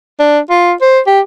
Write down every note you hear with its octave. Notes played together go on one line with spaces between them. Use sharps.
D4
F4
C5
G4